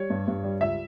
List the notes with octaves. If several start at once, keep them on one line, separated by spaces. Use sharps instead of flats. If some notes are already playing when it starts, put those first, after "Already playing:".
Already playing: G3 C#5
G2
G2
G3
C#2 E5